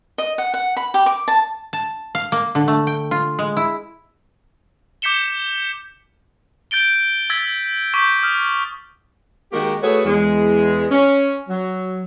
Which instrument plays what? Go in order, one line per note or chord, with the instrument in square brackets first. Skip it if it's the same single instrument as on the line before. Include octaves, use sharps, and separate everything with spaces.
[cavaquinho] D#5
F#5
F#5
B5
G4
D6
A5
[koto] A5
F5
A#3
D3
A3
G5
F4
G#3
E4
[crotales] D6 G6 B6 C#7 E7 G7
G6 A6 D7 G7
E6 G#6 A6 B6
C#6 D6 G6 B6
D#6 F6
[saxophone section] D#3 G#3 A#3 F#4 G4
A3 F#4 G#4 A4 B4 C#5
E2 G#3
C#4
F#3